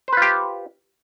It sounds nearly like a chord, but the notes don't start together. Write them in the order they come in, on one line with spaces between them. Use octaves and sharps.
C5 B4 F4 G4